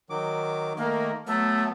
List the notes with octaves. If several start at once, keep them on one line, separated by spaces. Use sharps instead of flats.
D#3 F#3 D6
D#3 A3 A#3
F#3 A3 B3